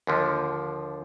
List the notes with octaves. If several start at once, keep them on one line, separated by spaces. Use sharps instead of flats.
D#2 D3 F3